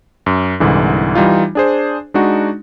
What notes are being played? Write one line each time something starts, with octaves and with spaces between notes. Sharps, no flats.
F#2
C2 G#2 D3 E3
E3 G3 D#4 F4
D4 G#4 C5
G#3 D4 D#4 F#4